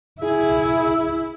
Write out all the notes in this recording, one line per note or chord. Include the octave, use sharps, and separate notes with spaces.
E4 G#4